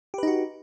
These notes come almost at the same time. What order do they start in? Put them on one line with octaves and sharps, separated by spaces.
G4 B4 D#4 F#4